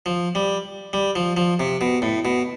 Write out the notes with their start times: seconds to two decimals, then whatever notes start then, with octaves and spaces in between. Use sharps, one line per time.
0.06 F3
0.35 G3
0.93 G3
1.16 F3
1.37 F3
1.60 C3
1.81 B2
2.02 A2
2.25 B2